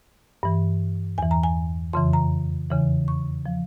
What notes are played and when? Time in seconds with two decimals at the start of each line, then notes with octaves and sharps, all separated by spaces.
0.43 G2 E3
1.18 E2 E3 G#5
1.31 A#5
1.44 G#5
1.93 F2 C#3 E3 C6
2.13 A#5
2.70 E2 C#3 E3
3.08 C#6
3.46 F3